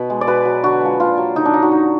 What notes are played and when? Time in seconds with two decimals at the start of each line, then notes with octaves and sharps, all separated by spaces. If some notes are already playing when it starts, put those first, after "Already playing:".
Already playing: B2 B4
0.10 G#3
0.21 D5
0.27 B2 B4
0.45 F#3
0.64 D3 F#4
0.81 F3 G#3
0.99 A#2 F4
1.18 F#3
1.35 D3 D#4
1.45 D4
1.53 F#3 D#4
1.62 F#4
1.72 D3